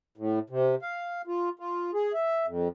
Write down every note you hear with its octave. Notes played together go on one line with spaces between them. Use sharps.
A2
C3
F5
F4
F4
G#4
E5
F2